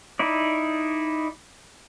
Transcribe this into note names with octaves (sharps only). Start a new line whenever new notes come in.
D#4 E4 D5